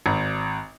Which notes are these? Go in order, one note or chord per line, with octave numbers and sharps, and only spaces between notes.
G#1